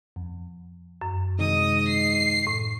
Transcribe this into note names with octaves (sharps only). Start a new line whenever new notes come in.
F2
F#2
G#2 C3 D#3 D#5 D#6
C7
A2